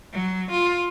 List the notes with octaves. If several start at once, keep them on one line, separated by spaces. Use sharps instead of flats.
F#3
F4